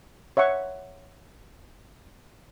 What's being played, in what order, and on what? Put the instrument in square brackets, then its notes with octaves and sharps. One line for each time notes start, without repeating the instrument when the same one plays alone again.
[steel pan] C#5 E5 F#5 C#6